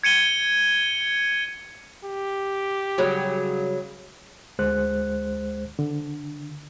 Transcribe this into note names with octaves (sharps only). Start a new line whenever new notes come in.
G#6 C#7 D#7 G7
G4
C#3 F#3 G3
D2 G#3 C5 F#6
D3